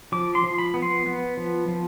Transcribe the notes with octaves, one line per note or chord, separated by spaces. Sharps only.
F3 D6
C6
F3
B5
B3
C6
B3
F3
F3